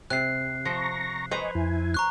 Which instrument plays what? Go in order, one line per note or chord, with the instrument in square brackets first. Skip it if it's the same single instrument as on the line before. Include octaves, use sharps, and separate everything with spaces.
[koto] C3 [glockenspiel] F#6 C7
[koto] F3 [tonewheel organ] A#5 C#6 A#6
[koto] B4 C5 A#5 [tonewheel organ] D#5 G#5 C#6
[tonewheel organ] F2 E4 G#5
[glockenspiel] A#5 C#6 F#6